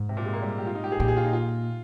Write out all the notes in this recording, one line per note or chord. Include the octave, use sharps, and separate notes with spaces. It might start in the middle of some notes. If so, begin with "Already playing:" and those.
Already playing: G#2
C3
A#2
G#3
A#3
G3
G4
F4
D#4
G4
G#4
A#2 G4
G#4
F4
D#4
F4